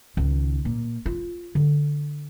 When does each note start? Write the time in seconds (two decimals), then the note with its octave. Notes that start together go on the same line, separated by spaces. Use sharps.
0.17 C#2 D#3
0.65 A#2
1.06 F4
1.55 D3